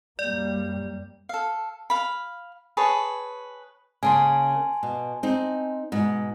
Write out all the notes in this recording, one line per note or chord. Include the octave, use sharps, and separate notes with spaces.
F#2 G3 A#3 D5
A4 F5
F5 B5
G#4 B4 C#5 A5
C#3 A#3 C#4 G#5 A5 C6
B2
C4 D#4
G#2 B2